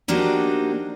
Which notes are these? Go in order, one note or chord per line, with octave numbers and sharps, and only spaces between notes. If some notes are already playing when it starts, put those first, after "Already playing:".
F3 A#3 D4 D#4 F#4 G4